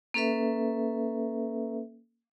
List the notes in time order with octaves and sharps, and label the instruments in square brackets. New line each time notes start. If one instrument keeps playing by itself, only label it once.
[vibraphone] A#3 C#4 A4 B4 E5